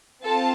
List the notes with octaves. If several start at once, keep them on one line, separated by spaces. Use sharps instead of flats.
C4 F4 A4 A5